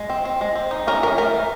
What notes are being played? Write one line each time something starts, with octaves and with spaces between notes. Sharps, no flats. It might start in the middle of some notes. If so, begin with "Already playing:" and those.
Already playing: G#3
C4
C4
G#3
C4
D#4
C#4 A#4
E3 A#4
A3 A#4
E3